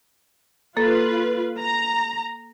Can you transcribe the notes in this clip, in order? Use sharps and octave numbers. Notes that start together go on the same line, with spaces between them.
A#3 F4 A4 B4
A#5